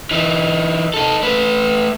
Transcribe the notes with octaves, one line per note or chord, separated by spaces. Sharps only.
E3 D#4
D#4 A4
A3 B4